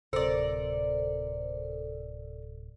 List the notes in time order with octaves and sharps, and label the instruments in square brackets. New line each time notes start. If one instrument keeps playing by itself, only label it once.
[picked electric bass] D1 C3 [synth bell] A4 [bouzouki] A#4 D5 [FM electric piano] C5